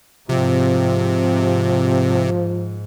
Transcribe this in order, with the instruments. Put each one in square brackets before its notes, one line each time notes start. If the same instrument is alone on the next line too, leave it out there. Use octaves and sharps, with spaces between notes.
[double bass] G#2 [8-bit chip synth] C3 [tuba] F3